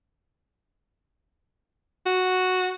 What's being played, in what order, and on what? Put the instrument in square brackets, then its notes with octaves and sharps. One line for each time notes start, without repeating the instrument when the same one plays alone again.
[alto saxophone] F#4